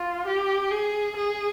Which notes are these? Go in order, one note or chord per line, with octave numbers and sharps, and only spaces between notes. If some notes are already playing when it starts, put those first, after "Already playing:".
Already playing: F4
G4
G#4
G#4